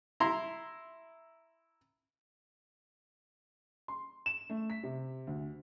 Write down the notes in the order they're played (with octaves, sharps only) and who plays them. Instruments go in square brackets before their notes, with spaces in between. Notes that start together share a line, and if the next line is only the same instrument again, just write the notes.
[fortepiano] E4 A#5 C6
[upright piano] C6
E7
A3
B6
C3
D2